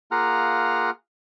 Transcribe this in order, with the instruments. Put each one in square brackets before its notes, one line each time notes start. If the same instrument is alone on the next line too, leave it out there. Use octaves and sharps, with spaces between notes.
[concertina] A#3 F4 G#4 F#5 A#5 F6